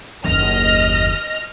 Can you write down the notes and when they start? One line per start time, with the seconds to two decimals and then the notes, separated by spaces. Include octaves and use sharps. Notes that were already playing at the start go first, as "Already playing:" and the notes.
0.25 F#1 D#2 D#5 F6 A#6